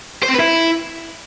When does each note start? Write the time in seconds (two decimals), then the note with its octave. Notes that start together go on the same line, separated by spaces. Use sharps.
0.23 C5
0.28 C4
0.34 B4
0.40 E4